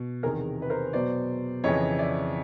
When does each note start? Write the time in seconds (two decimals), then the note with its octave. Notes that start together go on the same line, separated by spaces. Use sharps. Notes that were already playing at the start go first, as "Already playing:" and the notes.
Already playing: B2
0.23 E2 C3 D#3 G#4 A#4
0.62 B4
0.70 A#4 C5
0.93 B2 F#3 B3 C5 D5
1.64 F2 C#3 E3 C#5 D#5
1.99 D5 E5